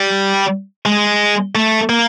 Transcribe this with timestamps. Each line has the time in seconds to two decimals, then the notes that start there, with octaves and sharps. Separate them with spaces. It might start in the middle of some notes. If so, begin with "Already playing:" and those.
Already playing: G3
0.86 G#3
1.55 A3
1.89 A#3